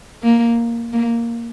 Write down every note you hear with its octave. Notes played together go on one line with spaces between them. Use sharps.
A#3
A#3